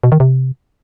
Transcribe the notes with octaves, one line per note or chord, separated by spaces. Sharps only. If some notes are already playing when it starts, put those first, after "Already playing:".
B2
D#3
C3